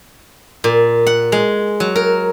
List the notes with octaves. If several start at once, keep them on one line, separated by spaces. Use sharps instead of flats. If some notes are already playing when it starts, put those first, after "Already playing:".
A#2
F#5
G#3
F#3
A#4